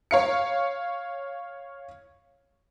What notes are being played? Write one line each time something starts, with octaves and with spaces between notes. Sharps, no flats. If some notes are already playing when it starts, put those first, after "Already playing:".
C#5 F5 C#7